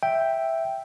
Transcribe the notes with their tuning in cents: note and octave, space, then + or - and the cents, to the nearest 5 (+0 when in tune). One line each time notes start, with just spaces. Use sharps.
E5 +0 G5 +0